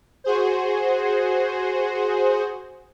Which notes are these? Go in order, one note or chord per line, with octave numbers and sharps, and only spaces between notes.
F#4 G#4 C5